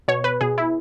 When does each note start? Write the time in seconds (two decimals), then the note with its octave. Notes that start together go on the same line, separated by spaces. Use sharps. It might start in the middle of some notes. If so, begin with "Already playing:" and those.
0.08 B2 C#5
0.24 B4
0.41 B2 G#4
0.58 E4